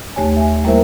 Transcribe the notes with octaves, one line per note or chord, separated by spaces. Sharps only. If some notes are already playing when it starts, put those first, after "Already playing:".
D#2 A3 G4 C#5 G#5
E5 G#5
G3 A#3 E4 A#4 C5 E5